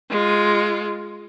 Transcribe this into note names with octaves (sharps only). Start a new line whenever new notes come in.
G#3 F4